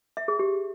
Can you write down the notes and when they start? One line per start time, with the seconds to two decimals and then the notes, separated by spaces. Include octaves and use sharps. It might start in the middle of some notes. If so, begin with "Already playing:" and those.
0.17 E5
0.28 G#4
0.39 G4